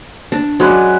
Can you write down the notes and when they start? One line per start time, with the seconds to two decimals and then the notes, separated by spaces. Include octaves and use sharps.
0.32 D4
0.60 F#3 G#3 C#4 B4 D5